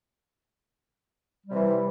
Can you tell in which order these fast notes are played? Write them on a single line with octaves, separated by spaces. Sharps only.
G3 C3 E3